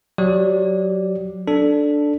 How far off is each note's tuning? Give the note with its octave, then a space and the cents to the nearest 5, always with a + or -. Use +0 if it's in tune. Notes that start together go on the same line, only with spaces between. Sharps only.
F#3 +0 G4 -30 D5 +0
D4 +0 A4 +0